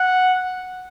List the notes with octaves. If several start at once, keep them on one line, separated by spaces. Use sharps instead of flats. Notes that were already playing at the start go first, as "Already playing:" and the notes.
Already playing: F#5